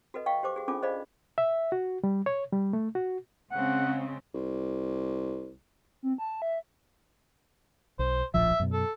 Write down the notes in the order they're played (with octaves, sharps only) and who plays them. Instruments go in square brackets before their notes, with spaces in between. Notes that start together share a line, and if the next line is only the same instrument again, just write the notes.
[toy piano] F#4 A4 B4 D#5
D#5 F5 G5 C#6
G4 C5 D6
F#4 G#4
C#4 D4 F4 G#4 A4 D6
G#4 C5 D5 D#5 F5 B5
[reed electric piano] E5
F#4
G3
C#5
G3
A3
F#4
[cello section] C#3 G#3 C4 [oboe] F#5
[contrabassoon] C2
[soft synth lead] C4
A5
E5
[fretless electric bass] B1 [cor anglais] C5
[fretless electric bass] D1 A#1 F3 [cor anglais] E5
[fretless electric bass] F#2 B2
[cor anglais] A4